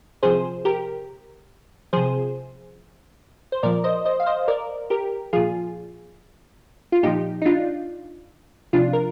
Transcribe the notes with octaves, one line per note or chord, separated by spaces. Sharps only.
C3 F3 G#4 C5
G4 A#4
C3 F3 G#4 C5
C5
A#2 F3 A#4 D5
C5 D#5
C5 D#5
F5
C5 D#5
A#4 D5
G4 A#4
A#2 F3 F4 G#4
F4
A#2 F3 D#4 G4
D#4
D4 F4
C3 F3 D4 F4
A#4